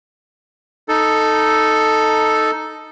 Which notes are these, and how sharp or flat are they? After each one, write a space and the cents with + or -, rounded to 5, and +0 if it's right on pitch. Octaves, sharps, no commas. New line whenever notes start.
D#4 +0 A4 +0